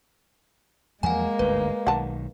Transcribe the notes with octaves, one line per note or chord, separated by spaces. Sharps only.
E2 F3 F#3 G#3 A#3 F#5 G#5
G1 D2 G#2 B4
B1 D#3 F#5 A5